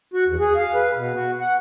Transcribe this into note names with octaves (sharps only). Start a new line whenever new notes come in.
F#4
E2
G#4
F5
B4
B2
F#4
F#5